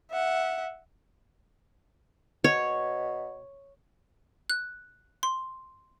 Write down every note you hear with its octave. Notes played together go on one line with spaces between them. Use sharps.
E5 F#5
B2 C#5
F#6
C6